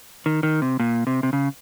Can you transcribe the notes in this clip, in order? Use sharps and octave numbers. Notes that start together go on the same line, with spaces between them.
D#3
D#3
C3
A#2
C3
C3
C#3